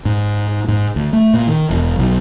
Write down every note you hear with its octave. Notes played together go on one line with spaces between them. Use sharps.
G#2
G#2
D2
A3
A#2
D#3
E1
B1